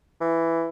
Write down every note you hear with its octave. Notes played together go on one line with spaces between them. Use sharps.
E3